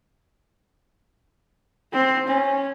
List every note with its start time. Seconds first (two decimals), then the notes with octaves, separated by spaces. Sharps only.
1.93 C4
2.28 C#4